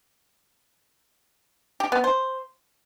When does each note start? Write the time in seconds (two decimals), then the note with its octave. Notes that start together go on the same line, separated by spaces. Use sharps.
1.80 G4
1.92 B3
2.04 C5